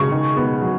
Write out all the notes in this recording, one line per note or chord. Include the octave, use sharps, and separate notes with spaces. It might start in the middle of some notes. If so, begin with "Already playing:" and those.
Already playing: C#3 C#6
D#3
B3
F#3